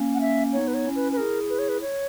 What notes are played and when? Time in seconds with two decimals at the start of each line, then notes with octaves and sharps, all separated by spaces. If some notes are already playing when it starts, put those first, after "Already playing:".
Already playing: A#3 C#4
0.14 F#5
0.21 E5
0.53 B3 D#4 C#5
0.68 B4
0.74 C#5
0.85 C#4 E4
0.96 B4
1.12 B4
1.17 E4 G#4 A#4
1.49 B4
1.59 C#5
1.69 B4
1.81 C#5